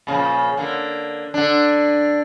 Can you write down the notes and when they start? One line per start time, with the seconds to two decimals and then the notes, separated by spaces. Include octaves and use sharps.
0.07 A#2 C#3 F3
0.57 D3 A#3
1.34 D3 D4